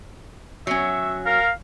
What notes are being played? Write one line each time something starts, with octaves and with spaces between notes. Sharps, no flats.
F#3 C#4 E5
A#4 F5